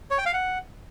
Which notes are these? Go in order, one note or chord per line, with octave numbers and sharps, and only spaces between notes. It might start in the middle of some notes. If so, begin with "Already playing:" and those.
C#5
G5
F5
F#5